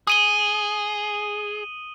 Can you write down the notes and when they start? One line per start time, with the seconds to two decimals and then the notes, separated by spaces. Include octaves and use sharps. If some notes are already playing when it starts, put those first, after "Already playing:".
0.07 G#4 D#6 D#7 G7